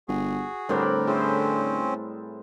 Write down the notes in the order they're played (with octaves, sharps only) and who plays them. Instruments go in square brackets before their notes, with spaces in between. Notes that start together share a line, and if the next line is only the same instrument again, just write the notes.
[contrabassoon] G1 [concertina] F#4 G#4
[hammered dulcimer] A2 C4 D5 [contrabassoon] D3 [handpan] G3 A#4 B4
[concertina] C4 C#4 [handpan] E4 G#4 C5 [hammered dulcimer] E5